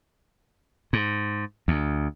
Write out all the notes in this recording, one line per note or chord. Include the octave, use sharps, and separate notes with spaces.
G#2
D2